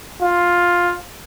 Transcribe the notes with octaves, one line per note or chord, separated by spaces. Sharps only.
F4